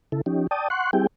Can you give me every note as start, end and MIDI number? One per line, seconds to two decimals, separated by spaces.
0.12 0.21 49
0.12 0.21 64
0.12 0.21 69
0.26 0.47 53
0.26 0.47 61
0.26 0.47 63
0.26 0.47 67
0.51 0.68 74
0.51 0.68 79
0.51 0.68 81
0.51 0.68 87
0.70 0.91 78
0.70 0.91 84
0.70 0.91 85
0.70 0.91 90
0.93 1.07 55
0.93 1.07 60
0.93 1.07 64
0.93 1.07 67
0.93 1.07 68
0.93 1.07 79